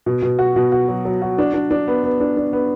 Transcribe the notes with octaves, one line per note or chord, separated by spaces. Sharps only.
B2
B2
F#4
B2
F#4
F#3
F#3
F#4
D4
D4
D4
B3
B3
D4
D4
B3